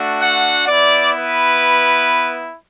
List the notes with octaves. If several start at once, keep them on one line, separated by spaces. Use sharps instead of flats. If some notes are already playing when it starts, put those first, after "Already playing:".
Already playing: A3 D4 F#4
F#5
B3 E4 D5
B4